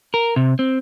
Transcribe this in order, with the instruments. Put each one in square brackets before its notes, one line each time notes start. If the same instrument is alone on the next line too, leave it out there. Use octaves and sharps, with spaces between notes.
[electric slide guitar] A#4
C3
C4